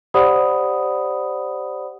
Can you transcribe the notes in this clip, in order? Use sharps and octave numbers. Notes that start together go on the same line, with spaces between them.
G4 C5 D5 F#5 B5 D#6